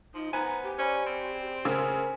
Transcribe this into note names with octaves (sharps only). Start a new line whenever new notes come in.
F3 D#4
B3 C5 G#5 A#5 B5
G4
C#4 C5 D5 B5
C4
C#3 A#4 C5 G#5 E6